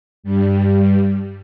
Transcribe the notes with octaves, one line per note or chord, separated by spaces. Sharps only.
G2 G3